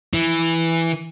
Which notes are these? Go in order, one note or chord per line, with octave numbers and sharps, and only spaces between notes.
E3